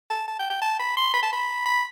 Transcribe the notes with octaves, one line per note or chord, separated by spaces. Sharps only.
A5
A5
G5
G5
A5
B5
C6
B5
A5
B5
B5